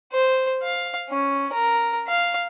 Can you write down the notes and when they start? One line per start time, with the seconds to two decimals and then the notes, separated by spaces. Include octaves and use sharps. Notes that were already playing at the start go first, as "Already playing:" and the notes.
0.12 C5
0.63 F5
1.10 C#4
1.53 A#4
2.08 F5